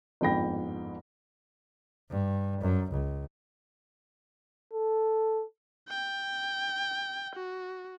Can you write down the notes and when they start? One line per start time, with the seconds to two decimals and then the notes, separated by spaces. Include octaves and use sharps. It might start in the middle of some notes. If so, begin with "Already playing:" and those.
0.21 G1 F2 G#2 G5 B5 A#6
2.10 G2
2.61 F#2
2.91 C#2
4.73 A4
5.89 G5
7.35 F#4